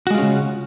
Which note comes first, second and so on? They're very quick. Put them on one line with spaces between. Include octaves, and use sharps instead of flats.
F#4 G#3 F4 C#4 C#3